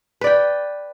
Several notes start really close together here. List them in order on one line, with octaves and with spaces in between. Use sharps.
B4 D5 G5